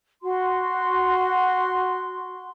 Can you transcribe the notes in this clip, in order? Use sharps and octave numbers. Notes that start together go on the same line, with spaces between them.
F#4 C6